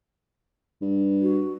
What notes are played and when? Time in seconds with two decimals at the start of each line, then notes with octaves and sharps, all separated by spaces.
0.82 G2
1.22 F#4